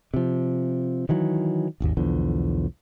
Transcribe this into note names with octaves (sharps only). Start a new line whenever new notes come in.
C3 F3
D#3 E3 F#3
D#1 G#1 D#2
B1 E2 D3 F3